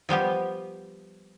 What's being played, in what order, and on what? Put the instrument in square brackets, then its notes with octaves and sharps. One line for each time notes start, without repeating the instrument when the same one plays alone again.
[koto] F3 G3 B3 G4